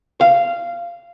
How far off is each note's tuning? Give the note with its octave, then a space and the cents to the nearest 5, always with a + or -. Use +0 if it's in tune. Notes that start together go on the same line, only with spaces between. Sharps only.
F5 -15